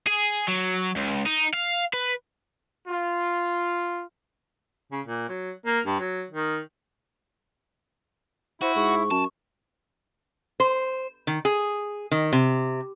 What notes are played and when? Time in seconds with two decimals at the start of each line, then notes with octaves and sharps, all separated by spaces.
0.07 G#4
0.48 F#3
0.96 C#2
1.26 D#4
1.54 F5
1.93 B4
2.88 F4
4.92 C#3
5.07 A#2
5.29 F#3
5.66 A#3
5.86 G2
6.00 F#3
6.31 D#3
8.62 E4 F#4 C5
8.76 G#2 C#6
9.11 F#2 A5
10.60 C5
11.27 D#3
11.45 G#4
12.11 D#3
12.33 C3